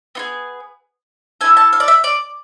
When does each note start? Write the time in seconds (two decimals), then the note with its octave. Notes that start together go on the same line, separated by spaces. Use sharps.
0.15 B3 F4 G#4
1.41 A3 E4 A4 G#5
1.57 A5
1.73 F5
1.80 D5
1.88 E5
2.04 D5